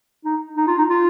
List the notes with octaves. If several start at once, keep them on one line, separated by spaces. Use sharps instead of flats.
D#4
D#4
F4
D#4
F4